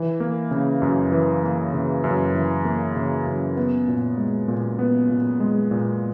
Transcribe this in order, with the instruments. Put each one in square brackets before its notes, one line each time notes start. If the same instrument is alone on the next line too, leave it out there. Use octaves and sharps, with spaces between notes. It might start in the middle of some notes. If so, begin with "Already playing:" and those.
Already playing: [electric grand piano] E3
A#3
C#3
F#2
E3
A#3
C#3
F#2
E3
A#3
C#3
F#2
B3
A#2
G#3
A#2
B3
A#2
G#3
A#2